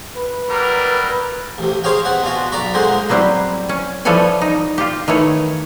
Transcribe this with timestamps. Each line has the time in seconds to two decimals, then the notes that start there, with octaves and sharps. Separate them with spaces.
0.16 B4
0.50 F#3 G3 A#4
1.58 A1 C3
1.84 G#4 C5 C#5 D#5 F5 G5
2.05 E3 C4 F#5
2.23 B2 D4 F4 F#4
2.52 B1 D5 A#5 B5 C#6
2.74 C#2 A#2 D3 G#3 C5 F#5
3.09 F#3 G3 C4 E4 G4
3.69 C#4
4.05 E3 F3 G3 A4 C#5 G#5
4.41 D#4
4.78 F4 G4
5.08 D#3 E3 A3 C#5